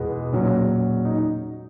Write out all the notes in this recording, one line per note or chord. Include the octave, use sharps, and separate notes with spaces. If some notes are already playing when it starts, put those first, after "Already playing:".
Already playing: E2 B2 G#3 B3
A#2 F#3 C#4
D#4